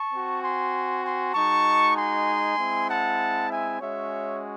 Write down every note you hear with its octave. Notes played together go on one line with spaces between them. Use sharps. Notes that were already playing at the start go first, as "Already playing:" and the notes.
Already playing: A5 C#6
C4 F#4
G#5 C6
G#5 C6
G#3 D#4 F#4 A5 C#6
G#5 C6
G#3 C4 E4
F#5 A5
E5 G#5
G#3 C#4 F#4 C#5 E5